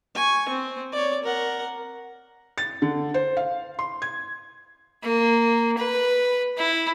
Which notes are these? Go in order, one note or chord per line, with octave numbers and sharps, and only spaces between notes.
G#5 C#6
C4
C#5 D5
A#4 F#5
A6
D3
C5
F5
C6
G#6
A#3
B4
E4